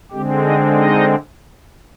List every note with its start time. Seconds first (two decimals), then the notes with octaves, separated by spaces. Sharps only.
0.12 D3 G#3 C4 G4
0.44 D#4 D#5
0.76 D#4 D#5